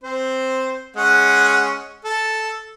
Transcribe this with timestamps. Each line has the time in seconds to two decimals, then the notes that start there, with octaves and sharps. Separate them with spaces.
0.03 C4 C5
0.96 G#3 C#4 F#5
2.05 A4